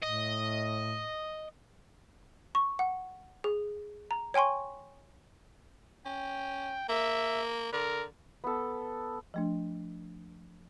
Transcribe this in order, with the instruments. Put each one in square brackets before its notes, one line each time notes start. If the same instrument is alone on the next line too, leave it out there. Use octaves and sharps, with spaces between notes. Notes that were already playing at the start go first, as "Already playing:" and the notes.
[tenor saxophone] A2 [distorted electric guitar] D#5
[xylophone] C#6
F#5
G#4
A#5
C#5 G5 G#5 C6 C#6
[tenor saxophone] C#4 [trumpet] G5
[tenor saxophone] A#3 [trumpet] E5
[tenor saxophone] D3 [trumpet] A#4
[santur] B3 A4
[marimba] F3 A3 D4